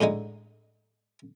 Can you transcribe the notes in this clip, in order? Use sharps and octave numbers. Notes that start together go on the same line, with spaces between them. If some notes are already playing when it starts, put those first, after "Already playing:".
A2 D3 G#3 D#4